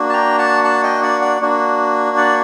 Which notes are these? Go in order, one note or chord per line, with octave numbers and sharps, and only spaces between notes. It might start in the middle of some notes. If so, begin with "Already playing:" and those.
Already playing: A#3 D4 F#4
A5
G5 A#5
F#5 A5
F#5 A5
D#5 G5
D5 F#5
D5 F#5
A#3 D4 F#4
D5 F#5